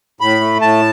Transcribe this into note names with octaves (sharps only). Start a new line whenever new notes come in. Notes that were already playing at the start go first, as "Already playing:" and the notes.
A2 B5
A3
A2 A5